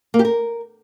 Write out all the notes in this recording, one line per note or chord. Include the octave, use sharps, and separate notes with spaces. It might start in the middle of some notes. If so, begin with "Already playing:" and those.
A#3
G4
A#4